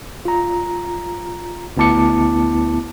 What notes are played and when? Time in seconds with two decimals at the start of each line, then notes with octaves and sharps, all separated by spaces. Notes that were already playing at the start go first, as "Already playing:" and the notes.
0.25 F4 A#5
1.77 D2 B3 E4 A5 D6 C#7